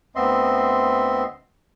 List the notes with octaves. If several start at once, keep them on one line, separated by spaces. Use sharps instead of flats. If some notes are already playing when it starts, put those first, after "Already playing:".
D2 B3 C4 D#5 E5 C6